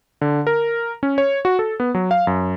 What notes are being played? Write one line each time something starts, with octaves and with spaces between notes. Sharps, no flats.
D3
A#4
C#4
C#5
F#4
A4
B3
F#3
F5
F#2